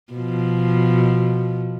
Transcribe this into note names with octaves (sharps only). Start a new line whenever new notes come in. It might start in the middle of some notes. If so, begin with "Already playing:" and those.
B2 F3